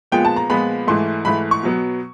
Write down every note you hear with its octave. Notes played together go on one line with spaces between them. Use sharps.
A#2 F3 G#3 B3 G5
A5
A#5
A#2 F3 G#3 B3 B5
G#2 E3 A3 C6
G#2 E3 A3 B5
C#6
B2 F#3 B3